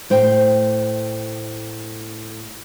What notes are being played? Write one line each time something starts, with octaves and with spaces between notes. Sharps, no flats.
A2 C5 G5